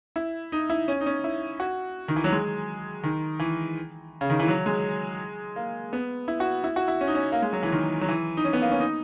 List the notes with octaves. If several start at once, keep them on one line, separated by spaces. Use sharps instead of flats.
E4
D#4
E4
C#4
D#4
C#4
E4
F#4
D#3
E3
F#3
G#3
D#3
E3
C#3
D#3
E3
F#3
G#3
A#3
B3
E4
F#4
E4
F#4
E4
C#4
D#4
C#4
A#3
G#3
F#3
E3
D#3
F#3
E3
D#4
C#4
B3
A#3
C#4
D#4